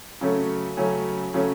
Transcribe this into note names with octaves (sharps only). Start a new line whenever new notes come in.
C#3 F#3 A3 C#4
C#3 F#3 A3 C#4
C#3 F#3 A3 C#4